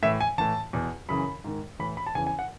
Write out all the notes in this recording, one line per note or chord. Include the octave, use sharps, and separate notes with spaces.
A2 E3 E5
G#5
A2 E3 A5
E2 B2
F#2 C#3 E3 B5
G#2 D#3
A2 E3 B5
B5
A5
E2 C#3 E3 G#5
G#5
F#5